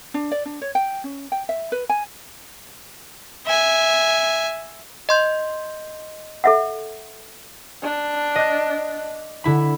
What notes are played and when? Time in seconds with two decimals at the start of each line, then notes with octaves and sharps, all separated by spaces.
0.14 D4
0.32 D5
0.45 D4
0.61 C#5
0.75 G5
1.04 C#4
1.32 G5
1.49 E5
1.72 B4
1.89 G#5
3.46 E5 G#5
5.09 D#5 C6 G6
6.44 A4 E5 F#5
7.82 D4
8.35 D#5 D6 F#6
9.44 D3 E4 B5